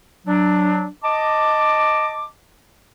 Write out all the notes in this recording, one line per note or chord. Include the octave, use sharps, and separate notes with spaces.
F#3 D4
D#5 A5 D6